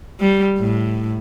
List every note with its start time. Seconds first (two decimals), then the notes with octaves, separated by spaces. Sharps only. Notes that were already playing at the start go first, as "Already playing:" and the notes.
0.20 G3
0.58 A2